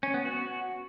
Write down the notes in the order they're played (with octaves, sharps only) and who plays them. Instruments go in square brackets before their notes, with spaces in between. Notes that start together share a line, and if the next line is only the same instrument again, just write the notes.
[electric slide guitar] C#4
B3
F#4